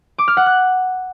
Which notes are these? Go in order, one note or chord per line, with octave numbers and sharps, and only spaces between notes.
D6
F6
F#5
F#6